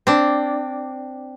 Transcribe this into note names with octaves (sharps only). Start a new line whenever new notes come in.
C4 D4